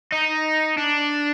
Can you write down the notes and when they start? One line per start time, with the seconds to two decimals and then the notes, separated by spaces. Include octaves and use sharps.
0.12 D#4
0.78 D4